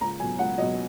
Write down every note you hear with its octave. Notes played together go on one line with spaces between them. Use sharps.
C#2 A#5
B2 F#3 G#5
C#2 F#5
B2 F#3 D#5